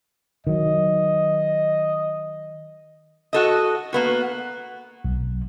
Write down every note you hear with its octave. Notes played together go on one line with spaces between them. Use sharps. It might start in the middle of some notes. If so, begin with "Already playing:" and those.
D#3 F#3 D#5
F#4 A4 D#5
A#3 B3 F#4
B1